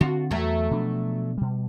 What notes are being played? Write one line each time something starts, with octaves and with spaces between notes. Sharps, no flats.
D3 C4 F4 F#4
E2 F#3 A3
B2 F3 D4
B2 G3